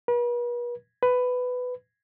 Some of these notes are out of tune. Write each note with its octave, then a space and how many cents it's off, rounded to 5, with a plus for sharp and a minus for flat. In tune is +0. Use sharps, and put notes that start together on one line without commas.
B4 -45
B4 +10